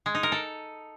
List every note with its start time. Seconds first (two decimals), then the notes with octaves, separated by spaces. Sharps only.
0.06 G#3
0.15 D#4
0.23 A#4
0.32 A4